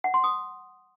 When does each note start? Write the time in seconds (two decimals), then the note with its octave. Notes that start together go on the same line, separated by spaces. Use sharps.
0.04 F#5
0.14 C6
0.24 D#6